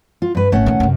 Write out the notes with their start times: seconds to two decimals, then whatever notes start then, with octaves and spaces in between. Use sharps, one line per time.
0.22 F4
0.35 G2 B4
0.52 G#1 A#2 A3 C#4 F#5
0.66 A#2 D#3
0.80 F#2 C3